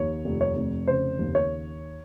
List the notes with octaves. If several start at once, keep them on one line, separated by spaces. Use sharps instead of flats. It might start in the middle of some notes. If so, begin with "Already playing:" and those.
Already playing: D#2 C#5
F1
C#5
F1
C#3 C5
D#2
C#5